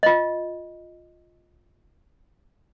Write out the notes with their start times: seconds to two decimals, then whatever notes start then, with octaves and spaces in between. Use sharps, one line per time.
0.03 F4 D#5